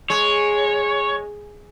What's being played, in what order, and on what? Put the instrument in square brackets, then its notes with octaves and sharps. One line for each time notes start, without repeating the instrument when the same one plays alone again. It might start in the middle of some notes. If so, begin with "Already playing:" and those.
[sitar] G#3 [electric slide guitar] C#5